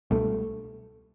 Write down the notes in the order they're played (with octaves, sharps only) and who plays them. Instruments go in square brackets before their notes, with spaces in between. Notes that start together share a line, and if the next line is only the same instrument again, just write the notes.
[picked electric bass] C#2 B2 G3 D4 [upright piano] A3